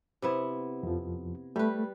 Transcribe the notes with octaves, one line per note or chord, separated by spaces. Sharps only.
C3 B3 E4
F2 F3
G3 A3 B4